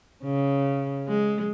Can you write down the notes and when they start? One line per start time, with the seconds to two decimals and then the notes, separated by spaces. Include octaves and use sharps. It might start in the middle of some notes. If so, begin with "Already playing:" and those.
0.24 C#3
1.08 G#3